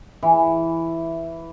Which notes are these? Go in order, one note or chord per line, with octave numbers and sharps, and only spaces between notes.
E3